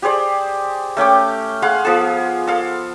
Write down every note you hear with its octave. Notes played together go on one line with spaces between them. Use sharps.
G4 G#4 C5 D5
A3 C#4 G5 D6
G#4 F5 F#5 C6
F3 B3 G#4
A4 F5